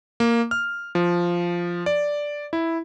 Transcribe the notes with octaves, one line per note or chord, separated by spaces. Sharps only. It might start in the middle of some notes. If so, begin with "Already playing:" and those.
A#3
F6
F3
D5
E4